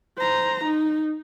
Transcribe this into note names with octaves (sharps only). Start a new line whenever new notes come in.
C5 A#5
D#4